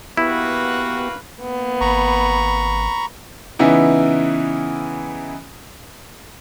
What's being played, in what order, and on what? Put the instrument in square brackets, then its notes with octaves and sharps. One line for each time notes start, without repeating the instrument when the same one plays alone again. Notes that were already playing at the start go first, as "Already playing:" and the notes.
[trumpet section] A#3 F#4 B4 [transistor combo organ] B3 G4 [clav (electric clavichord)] E4
[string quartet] A#3 B3
[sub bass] G#1 [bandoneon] A#5 B5 C#6
[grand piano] C#3 E3 B3 D#4 E4